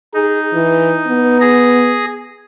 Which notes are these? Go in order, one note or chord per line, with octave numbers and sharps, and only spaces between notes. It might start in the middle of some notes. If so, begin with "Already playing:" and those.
D#4 G#4
E3
B3
G#4 A#6